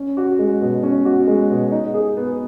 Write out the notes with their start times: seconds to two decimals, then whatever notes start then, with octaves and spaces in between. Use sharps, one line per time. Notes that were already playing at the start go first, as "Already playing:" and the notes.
Already playing: C#4
0.17 F#4
0.39 G#3
0.61 B2
0.83 C#4
1.05 F#4
1.27 G#3
1.50 B2
1.71 D#4
1.94 G#4
2.17 B3